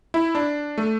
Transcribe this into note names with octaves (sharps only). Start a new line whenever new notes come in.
E4
D4
A3